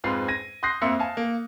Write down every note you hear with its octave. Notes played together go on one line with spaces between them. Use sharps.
F2 G#2 G#3 F4 B4 C7
G#6 A#6 D#7
C6 D#6 F#6 G6 A#6 C7
F2 A#3 E5 C6 C#7
F5 G#5 A5
A#3